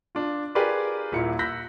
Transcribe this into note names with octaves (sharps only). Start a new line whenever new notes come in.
D4 F4
F4 G4 G#4 A#4 B4 D5
D#1 A#2 E4 C#7
E6 F#6 G6 A#6 B6